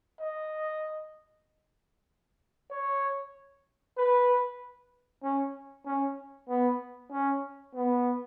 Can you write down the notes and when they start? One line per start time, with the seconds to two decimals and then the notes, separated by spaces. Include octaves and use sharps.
0.20 D#5
2.70 C#5
3.97 B4
5.23 C#4
5.85 C#4
6.49 B3
7.11 C#4
7.74 B3